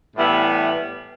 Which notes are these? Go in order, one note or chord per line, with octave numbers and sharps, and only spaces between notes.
A2 E3 G3 B3 E4